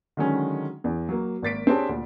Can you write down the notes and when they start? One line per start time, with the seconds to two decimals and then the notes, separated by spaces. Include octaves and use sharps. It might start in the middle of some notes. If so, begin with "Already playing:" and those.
0.17 D3 D#3 F#3 G#3 C#4
0.84 E2
1.09 F#3 A#3
1.42 G#1 A#3 A6 B6 D7
1.67 C4 D4 G4 G#4 C#5 A5
1.89 D2 A#2